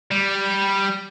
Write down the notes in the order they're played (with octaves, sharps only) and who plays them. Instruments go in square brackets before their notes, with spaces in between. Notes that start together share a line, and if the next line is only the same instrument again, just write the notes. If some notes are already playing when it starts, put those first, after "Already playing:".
[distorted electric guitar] G3